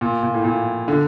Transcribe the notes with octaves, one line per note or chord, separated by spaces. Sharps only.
A#2
A#2
A2
A#2
D3